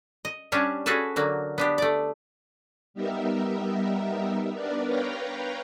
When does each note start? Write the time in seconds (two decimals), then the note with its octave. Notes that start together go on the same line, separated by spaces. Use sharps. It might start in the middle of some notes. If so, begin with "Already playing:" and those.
0.25 D#5
0.52 G3 C#4 D4 G4 C#5
0.86 C#4 F#4 G#4 A4 B4 A5
1.16 D3 F#3 A#3
1.58 B3 D4 G4
1.78 A3 D5
2.94 G3 B3 D#4 G4 A#4 E5
4.55 B3 D4 A#4 B4 D5
4.86 B4 C#5 F5 G5 A#5